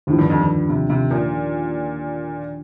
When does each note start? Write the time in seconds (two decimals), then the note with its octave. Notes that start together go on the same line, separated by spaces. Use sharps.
0.07 D#2 A2 D3 F3
0.18 G2
0.30 F2
0.41 G2
0.70 C3
0.90 C3
1.11 A#2